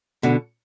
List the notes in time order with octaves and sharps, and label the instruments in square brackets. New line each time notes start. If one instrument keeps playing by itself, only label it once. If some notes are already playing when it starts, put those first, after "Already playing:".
[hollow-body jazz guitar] B2 D3